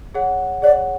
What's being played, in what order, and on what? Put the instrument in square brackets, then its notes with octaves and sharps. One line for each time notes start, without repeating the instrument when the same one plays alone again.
[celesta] G#4 C#5 F#5
[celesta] G#4 C#5 F#5 [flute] D5